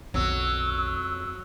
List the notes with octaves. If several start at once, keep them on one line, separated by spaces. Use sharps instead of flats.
B1 F2 D#3 F#3 E6